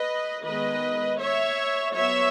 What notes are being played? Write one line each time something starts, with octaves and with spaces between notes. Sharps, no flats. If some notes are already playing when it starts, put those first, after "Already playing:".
Already playing: B4 D#5
D#3 G#3 B3 B4 D#5
C#5 E5
F#3 B3 C#5 E5